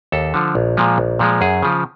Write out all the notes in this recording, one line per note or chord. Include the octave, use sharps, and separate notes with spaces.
D#2 A4
D3 F3
A#1
A#2 F3 G#3
A#1
A#2 F3 G#3
F#2 G#4
C#3 F3